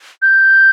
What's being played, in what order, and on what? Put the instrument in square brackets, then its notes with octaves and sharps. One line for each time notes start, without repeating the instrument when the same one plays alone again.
[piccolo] G6